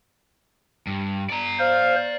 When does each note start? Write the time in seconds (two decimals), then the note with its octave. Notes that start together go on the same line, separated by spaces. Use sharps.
0.87 G2
1.30 D5 A#5
1.59 C5 F5